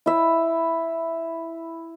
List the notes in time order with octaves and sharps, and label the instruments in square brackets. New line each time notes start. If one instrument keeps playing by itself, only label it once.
[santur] E4 E5